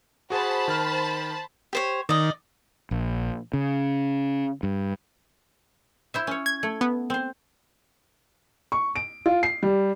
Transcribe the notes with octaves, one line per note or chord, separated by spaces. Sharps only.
F#4 G#4 C5 F#5 A5 B5
D#3 F6
G4 C5 C#5
D#3 D5 D#5
A#1
C#3
G2
E4 C5 E5
C#4 C#5
G#6
A3
B3
C4 C5
C#6
D7
F4
C7
G3